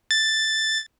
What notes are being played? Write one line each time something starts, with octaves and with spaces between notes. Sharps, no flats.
A6